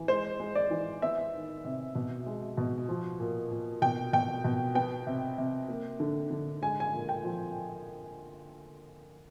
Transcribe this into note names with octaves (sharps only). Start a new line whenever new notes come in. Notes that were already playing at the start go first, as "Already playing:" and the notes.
Already playing: E3
G#3 C5
G#3
D5
E3
B3 E5
D#3
C3
B2
G#3
B2
F3
A#2
A#2
B2 G5
B2 G5
B2
B3 G5
C3
C3
A#3
D3
D3
G#3 G#5
G#5
A#2
G5
F3